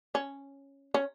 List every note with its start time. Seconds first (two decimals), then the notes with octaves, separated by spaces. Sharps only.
0.15 C#4
0.94 C#4